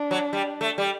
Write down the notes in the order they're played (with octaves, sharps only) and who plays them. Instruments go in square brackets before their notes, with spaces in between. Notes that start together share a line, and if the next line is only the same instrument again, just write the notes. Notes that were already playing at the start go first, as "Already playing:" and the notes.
Already playing: [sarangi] D4
[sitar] F#3
G3
A3
G3